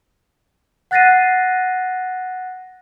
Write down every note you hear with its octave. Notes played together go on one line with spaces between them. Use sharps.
F#5 F#6 A6 A#6 C7 D#7